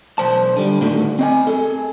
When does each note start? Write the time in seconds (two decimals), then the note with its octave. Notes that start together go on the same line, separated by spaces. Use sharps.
0.18 B1 C5 A5
0.57 D3 G3
0.81 A2 D3 D#3 A3 F#4
1.19 C4 D#5 G#5
1.47 G#4 A4